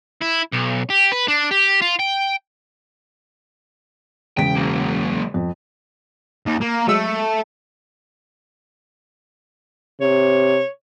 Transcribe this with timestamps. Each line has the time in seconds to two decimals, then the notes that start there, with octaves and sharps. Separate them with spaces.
0.22 E4
0.53 B1
0.90 G4
1.12 B4
1.28 D4
1.51 G4
1.82 F4
1.99 G5
4.37 E1 C#3 G5 B6
4.56 F#3 A#3
5.34 F2
6.46 D#2
6.61 A#3
6.88 F#3 G#3 A3 E6
10.01 C3 C#5